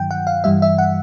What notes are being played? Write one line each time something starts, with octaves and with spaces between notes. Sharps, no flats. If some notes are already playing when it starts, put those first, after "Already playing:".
Already playing: G2 D#3 F#3 G5
F#5
F5
G2 E3 G3 E5
E5
F#5